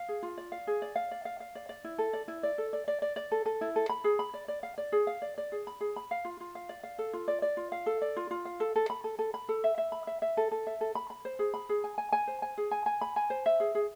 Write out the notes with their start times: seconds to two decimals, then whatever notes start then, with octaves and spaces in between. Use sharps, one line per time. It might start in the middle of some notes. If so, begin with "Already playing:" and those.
Already playing: F5
0.09 G#4
0.23 F4
0.38 D5
0.52 F5
0.67 G#4
0.82 D5
0.96 F5
1.11 D5
1.25 F5
1.40 F5
1.55 D5
1.69 D5
1.84 E4
1.98 A4
2.13 D5
2.28 E4
2.43 D5
2.58 A4
2.73 D5
2.88 D5
3.02 D5
3.16 D5
3.32 A4
3.46 A4
3.61 E4
3.76 A4
3.89 B5
4.04 G#4
4.19 B5
4.34 D5
4.48 D5
4.63 F5
4.78 D5
4.92 G#4
5.07 F5
5.22 D5
5.38 D5
5.52 G#4
5.67 B5
5.81 G#4
5.96 B5
6.11 F5
6.25 F4
6.41 F4
6.55 F5
6.69 D5
6.83 F5
6.98 A4
7.13 F4
7.28 D5
7.42 D5
7.57 F4
7.72 F5
7.86 A4
8.02 D5
8.17 F4
8.31 F4
8.45 F5
8.60 A4
8.76 A4
8.90 B5
9.04 A4
9.19 A4
9.34 B5
9.49 A4
9.64 E5
9.78 E5
9.92 B5
10.07 E5
10.22 E5
10.37 A4
10.51 A4
10.67 E5
10.81 A4
10.95 B5
11.10 B5
11.25 C5
11.39 G#4
11.54 B5
11.69 G#4
11.84 G#5
11.98 G#5
12.12 G#5
12.27 C5
12.42 G#5
12.58 G#4
12.71 G#5
12.86 G#5
13.01 B5
13.16 G#5
13.30 C5
13.46 E5
13.60 G#4
13.75 G#4